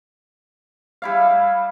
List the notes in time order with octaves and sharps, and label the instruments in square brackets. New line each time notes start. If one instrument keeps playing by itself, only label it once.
[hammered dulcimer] G3 E4 F5